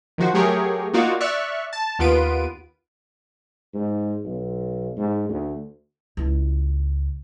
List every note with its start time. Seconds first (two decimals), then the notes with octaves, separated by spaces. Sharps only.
0.18 D#3 F3 F#4 C5
0.34 F#3 A3 G4 G#4 A#4 C#5
0.93 A#3 D#4 F4 F#4 D5 F5
1.20 D5 E5 C#6 F6 F#6
1.73 A5
1.99 D#2 B3 F4 B4 D7 D#7
3.74 G#2
4.25 B1
4.97 G#2
5.29 D2
6.17 C#2 E4